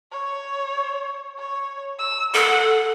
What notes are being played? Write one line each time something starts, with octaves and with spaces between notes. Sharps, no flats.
C#5
C#5
E6
A4 F#5